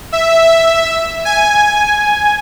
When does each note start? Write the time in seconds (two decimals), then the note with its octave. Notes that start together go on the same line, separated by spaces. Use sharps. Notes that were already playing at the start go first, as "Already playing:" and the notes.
0.12 E5
1.25 G#5